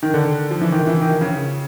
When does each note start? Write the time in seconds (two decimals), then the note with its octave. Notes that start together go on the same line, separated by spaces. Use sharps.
0.03 D#3
0.14 D3
0.51 F3
0.61 E3
0.72 D#3
0.87 E3
1.02 D#3
1.11 F3
1.21 C#3